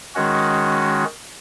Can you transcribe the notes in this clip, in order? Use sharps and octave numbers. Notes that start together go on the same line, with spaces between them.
D#3 G#3 C#4 F#4